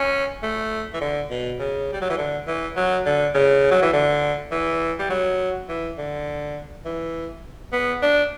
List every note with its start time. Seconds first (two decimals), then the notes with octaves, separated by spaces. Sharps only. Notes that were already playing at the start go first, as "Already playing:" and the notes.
Already playing: C#4
0.43 A3
0.94 E3
1.01 D3
1.30 B2
1.59 C#3
1.93 G3
2.01 F#3
2.10 E3
2.18 D3
2.48 E3
2.76 F#3
3.06 D3
3.35 C#3
3.71 F#3
3.82 E3
3.93 D3
4.52 E3
4.99 G3
5.10 F#3
5.69 E3
5.98 D3
6.85 E3
7.73 B3
8.02 D4